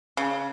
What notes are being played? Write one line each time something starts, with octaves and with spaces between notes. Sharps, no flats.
C#3